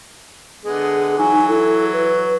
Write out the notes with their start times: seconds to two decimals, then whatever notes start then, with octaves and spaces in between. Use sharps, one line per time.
0.64 D3 G#3 B3 G#4
1.18 E3 F#3 D#4 G#5
1.48 E4 A4
1.93 B4